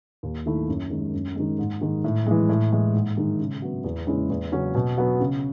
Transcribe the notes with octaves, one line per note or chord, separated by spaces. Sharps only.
D#2
D#3 A3 E4
F#2
D#3 G#3
F#2
D#3 G#3
G#2
D#3 G#3
A2
E3 G#3
A2
E3 G#3
G#2
D#3 G#3
C#3
F#3 B3
E2
C#3 G#3 C#4 E4
E2
C#3 F#3 C#4
B2
F#3 B3
C#3